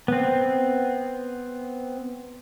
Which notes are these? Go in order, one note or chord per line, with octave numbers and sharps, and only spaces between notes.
B3 C4